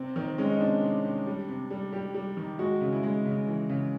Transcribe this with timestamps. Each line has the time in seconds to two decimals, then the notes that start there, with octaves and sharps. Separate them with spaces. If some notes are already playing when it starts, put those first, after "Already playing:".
Already playing: C3 C4
0.16 D#3 C4
0.38 G#3 C#4
0.49 D#4
0.60 C3 D4
0.82 C3
1.04 C3
1.27 G3
1.48 C3
1.71 G3
1.93 G3 G4
2.15 G3
2.37 D#3
2.59 G#3 F#4
2.81 C#3
2.92 E4
3.03 G#3
3.25 C#3
3.48 E3
3.69 C#3